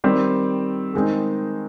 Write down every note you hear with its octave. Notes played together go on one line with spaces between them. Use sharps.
D#3 G3 C4
D#3 G#3 C4 D#4